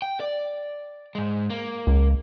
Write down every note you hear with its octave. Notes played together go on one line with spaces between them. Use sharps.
G5
D5
G#2 G#3
A#3
C#2